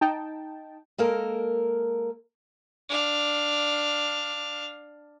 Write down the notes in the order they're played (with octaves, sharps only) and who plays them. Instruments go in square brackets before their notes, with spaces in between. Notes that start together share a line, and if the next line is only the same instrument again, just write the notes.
[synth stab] D#4 G5 A5
[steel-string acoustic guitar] G#3 A#3 A4 A#4
[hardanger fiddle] D4 F5